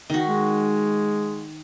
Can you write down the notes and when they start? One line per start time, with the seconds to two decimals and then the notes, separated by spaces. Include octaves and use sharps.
0.10 D#3 F#4
0.27 G#3